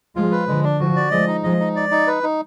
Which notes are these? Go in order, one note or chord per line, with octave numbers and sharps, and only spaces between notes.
F3 G#3 F4
B4
D3 F3 G#3
D4
D3 F3 F#4
D5
F3 G#3 D#5
D#4
F3 G#3 D#5
D#4
D5
D#4
B4
D#4